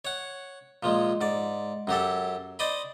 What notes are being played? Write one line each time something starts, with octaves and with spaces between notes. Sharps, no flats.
C#5 F#5
A#2 F3 G#3
G#2 D5
F#2 F#3 G4 A4
C5 D5 D#5 B5